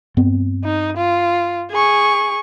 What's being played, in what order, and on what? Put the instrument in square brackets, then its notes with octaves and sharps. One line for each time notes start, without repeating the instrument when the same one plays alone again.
[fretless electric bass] G2 B3 C4
[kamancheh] D#4
F4
G#4 C#6